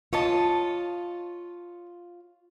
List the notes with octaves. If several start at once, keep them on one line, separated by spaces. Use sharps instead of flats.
F4 C#5 D#5 A5